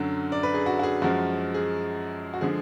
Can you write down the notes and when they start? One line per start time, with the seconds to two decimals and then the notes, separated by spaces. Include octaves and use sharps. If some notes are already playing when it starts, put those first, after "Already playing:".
Already playing: F#2 D3 F#3
0.32 D5
0.43 B4
0.54 G#4
0.66 F#4
0.79 F#4
0.83 G#4
1.02 F#2 F3 G#3 F#4
1.54 G#4
2.34 F#4
2.41 D3 F3 G#3 G#4